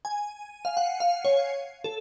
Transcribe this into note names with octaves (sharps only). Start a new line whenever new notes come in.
G#5
F5
F#5
F5
C#5
A4